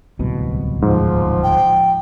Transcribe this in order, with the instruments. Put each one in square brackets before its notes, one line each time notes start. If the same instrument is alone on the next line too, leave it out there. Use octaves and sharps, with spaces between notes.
[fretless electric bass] D1 C2 B2
[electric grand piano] G#2 [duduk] F3
[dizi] G5